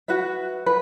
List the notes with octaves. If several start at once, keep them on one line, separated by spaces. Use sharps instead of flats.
F#4 B4 E5
B4